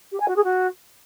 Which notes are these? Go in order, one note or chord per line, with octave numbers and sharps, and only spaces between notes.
G4
G#5
F#4
G#4
F#4